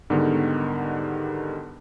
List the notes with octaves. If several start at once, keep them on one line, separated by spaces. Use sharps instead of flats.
G#2 D3 D#3 G3 B3